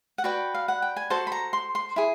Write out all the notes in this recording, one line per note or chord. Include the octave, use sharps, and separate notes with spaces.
F#5
F#4 B4 D5 G5
F5
F#5
G5
G#5
F#4 A4 C5 A5
B5
A#5
C6
C6
E4 G#4